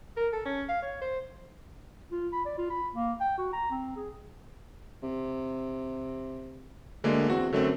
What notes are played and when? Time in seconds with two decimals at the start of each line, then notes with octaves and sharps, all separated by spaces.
0.17 A#4
0.33 A4
0.45 C#4
0.69 F5
0.82 C#5
1.02 C5
2.12 F4
2.32 B5
2.46 D5
2.58 F4
2.70 B5
2.95 A#3
3.20 G5
3.38 F#4
3.53 A#5
3.71 C4
3.96 G#4
5.03 C3
7.04 D2 D3 G#3 A#3
7.28 E2 C4 F#4
7.53 F#2 D3 A3 C4